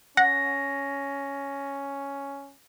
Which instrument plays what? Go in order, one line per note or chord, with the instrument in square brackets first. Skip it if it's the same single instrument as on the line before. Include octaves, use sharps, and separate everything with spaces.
[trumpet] C#4 [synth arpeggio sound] F#5 [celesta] A#6